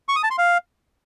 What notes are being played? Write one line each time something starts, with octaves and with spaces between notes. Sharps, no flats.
C#6
D#6
A5
C6
F5